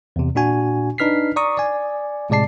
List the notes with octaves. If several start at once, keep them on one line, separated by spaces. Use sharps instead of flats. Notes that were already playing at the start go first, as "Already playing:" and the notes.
E2 C3
A#2 D4 F#4 G#5
D4 D#4 B4 F6 B6 C7
D5 A#5 C#6 D#6
D5 G#5
A2 C3 G#3 D5 A5 C7